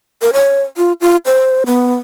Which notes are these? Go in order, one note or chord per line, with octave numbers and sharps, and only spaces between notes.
A#4
C#5
F4
F4
C5
B3